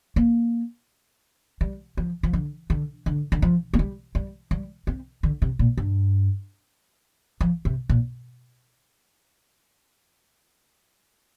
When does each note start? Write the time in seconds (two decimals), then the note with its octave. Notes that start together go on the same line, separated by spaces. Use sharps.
0.16 A#3
1.61 G3
1.97 F3
2.23 F3
2.33 D3
2.70 D3
3.06 D3
3.32 D3
3.42 F3
3.74 A#3
3.79 G3
4.15 G3
4.51 G3
4.87 C4
5.23 D3
5.42 C3
5.59 A#2
5.77 G2
7.41 F3
7.65 C3
7.89 A#2